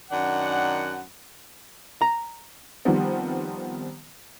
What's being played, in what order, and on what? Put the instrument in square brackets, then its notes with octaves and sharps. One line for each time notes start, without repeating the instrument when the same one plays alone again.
[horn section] F#2 D#3 D4 F#5
[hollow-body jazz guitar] A#5
[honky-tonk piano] D#3 F3 G3 B3 C4